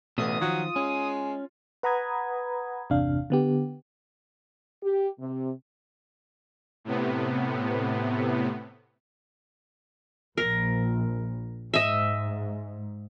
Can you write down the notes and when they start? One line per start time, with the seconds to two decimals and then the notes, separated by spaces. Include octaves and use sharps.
0.18 A1 B2 A3 B3 D#6
0.41 D#3 F3 F#3 F4
0.76 G#3 C#4
1.83 B4 F#5 A#5 B5 D#6 G#6
2.90 G1 E2 C3 D4 F5
3.30 D3 B3 G4
4.83 G4
5.20 C3
6.84 A2 C3 B3
10.38 A#1 A#4
11.74 G#2 D#5 E5